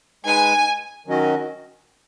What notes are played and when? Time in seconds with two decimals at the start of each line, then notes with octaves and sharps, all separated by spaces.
0.25 G#3 D#4 B4 G#5
1.06 D#3 F#3 C#4 F#4 D#5